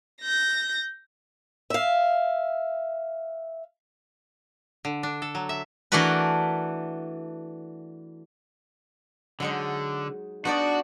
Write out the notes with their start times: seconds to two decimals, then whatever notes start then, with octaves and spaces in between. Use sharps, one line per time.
0.22 G6 A#6
1.70 E5 F5
4.85 D3
5.03 D4
5.22 A4
5.35 F#3
5.49 E5
5.92 E3 A3 D4 F#4 A#4 B4
9.40 D3 F#3 G#3 D#4
10.45 B3 D4 D#4 F#4 D5